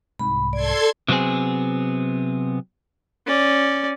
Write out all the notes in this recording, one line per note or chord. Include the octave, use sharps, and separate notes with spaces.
C2 G#2 B5
A4 D5 C6 G#6
C3 F#3 B3 C4 G#4
C#4 D5